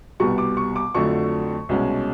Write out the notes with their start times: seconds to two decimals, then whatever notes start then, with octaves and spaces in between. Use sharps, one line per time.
0.20 C2 B2 G3 B3 C#6
0.38 D6
0.57 C#6
0.76 D6
0.94 F2 D3 F#3 A3 C#6
1.69 C2 B2 G#3 C#4